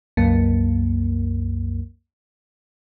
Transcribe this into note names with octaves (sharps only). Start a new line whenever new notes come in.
C2 F#2 A#3